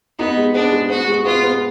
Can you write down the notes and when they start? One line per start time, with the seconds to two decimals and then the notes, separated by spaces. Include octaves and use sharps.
0.19 B3 D#4
0.37 G#3
0.55 B3 D4
0.72 G#3
0.90 B3 F#4
1.08 G#3
1.25 B3 F4
1.43 B3